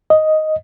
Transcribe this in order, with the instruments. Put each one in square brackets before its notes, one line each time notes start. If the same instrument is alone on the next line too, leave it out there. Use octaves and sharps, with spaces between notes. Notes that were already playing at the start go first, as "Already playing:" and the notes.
[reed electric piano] D#5